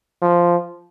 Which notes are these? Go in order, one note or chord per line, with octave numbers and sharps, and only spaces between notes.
F3